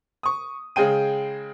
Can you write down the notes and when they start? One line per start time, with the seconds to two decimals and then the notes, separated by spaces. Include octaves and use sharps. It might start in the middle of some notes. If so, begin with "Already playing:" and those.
0.23 C#6 D#6
0.76 C#3 G#3 G#4 G5 D#7